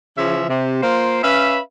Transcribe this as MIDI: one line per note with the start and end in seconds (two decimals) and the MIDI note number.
0.17 0.45 49
0.17 0.45 52
0.17 0.45 53
0.17 0.45 76
0.49 0.81 48
0.83 1.22 58
0.83 1.22 65
0.83 1.22 72
1.23 1.58 61
1.23 1.58 71
1.23 1.58 76
1.23 1.58 77